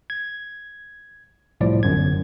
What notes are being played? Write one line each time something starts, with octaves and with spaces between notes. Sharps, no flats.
G#6
C2 A2 F3 D5
G1 F#2 G#6